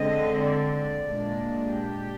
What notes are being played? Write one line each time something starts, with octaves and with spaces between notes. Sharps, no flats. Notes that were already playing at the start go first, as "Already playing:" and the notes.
Already playing: D3 G#3 C4 D#5
D5
A#2 G#3 D4
G4